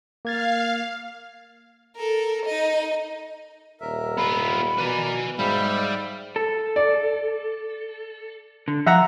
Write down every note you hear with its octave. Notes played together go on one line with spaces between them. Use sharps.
A#3 F5 G#6 A6
A4 A#4
D#4 D#5
D#1 A#4 E5
B3 F4 B5
B2 A#4 B4 D5 G#5
G#2 G3 E5 F5 G5 B5
A4
D5
D3
F3 E5 F#5 A#5